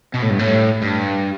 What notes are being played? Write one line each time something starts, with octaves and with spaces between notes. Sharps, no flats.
B2
A2
G2
A2
G2